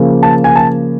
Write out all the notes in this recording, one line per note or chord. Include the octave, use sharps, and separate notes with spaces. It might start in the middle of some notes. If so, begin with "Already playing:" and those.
Already playing: C#3 F3 A#3
A5
G#5
A5